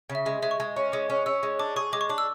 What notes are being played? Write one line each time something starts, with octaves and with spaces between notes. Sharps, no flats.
C#3
E5
G#3 E5
G#3 E5
C#6
G#3
C#4
G#3 D6
C#4
C#4 E6
G#3
D4 D6
G#4 C#6
G#3 D6
C#6
D4 D6
E6